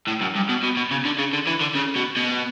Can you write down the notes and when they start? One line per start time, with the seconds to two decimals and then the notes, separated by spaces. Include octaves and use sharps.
0.07 A2
0.21 F#2
0.36 G2
0.49 B2
0.63 B2
0.77 B2
0.91 C#3
1.05 D3
1.18 C#3
1.33 D3
1.47 E3
1.60 D3
1.75 C#3
1.96 B2
2.16 B2